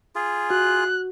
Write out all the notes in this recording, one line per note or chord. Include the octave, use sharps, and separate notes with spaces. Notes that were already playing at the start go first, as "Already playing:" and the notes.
F4 G#4
F#4 F#6